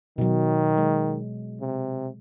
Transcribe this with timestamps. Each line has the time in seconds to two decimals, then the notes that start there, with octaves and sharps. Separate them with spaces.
0.18 B2 D#3 F#3
0.78 G#3
1.61 C3